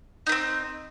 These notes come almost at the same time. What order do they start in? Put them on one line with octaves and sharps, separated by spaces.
D#4 B3 C4